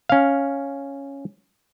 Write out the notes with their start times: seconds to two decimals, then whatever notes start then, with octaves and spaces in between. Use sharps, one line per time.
0.10 C#4 F5